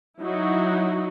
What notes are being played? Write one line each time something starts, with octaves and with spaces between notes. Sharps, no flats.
F#3 D#4 E4 F#4